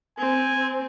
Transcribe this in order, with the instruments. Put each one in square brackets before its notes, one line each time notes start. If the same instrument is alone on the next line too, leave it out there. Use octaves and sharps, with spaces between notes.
[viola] C4 [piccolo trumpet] G#5